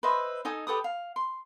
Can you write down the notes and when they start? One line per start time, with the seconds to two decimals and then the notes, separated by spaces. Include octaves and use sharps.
0.03 B4 C5 D#5 E5
0.45 D#4 A4 G#5 D#6
0.67 G4 A4 B4 D#6
0.84 F5
1.16 C6